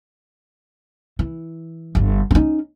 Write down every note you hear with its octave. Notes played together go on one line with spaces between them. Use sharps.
E3
G1 D3
C#4 D#4